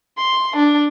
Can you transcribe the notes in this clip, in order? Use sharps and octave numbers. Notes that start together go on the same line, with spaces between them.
C6
D4